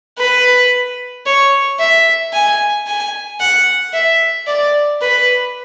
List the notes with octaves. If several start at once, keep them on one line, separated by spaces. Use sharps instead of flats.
B4
C#5
E5
G#5
G#5
F#5
E5
D5
B4